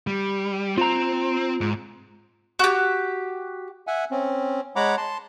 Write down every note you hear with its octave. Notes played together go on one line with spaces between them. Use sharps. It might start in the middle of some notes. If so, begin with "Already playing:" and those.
G3
C4 F4 A#5
G#2
F#4 G4
E5 F#5 G#5
C4 C#4
G#3 C#5 F#5 A#5 B5 D6
A5 C6